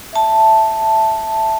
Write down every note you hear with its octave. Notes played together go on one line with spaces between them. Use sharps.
E5 A5